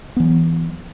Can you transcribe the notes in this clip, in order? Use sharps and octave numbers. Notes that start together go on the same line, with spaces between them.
E3 F#3 B3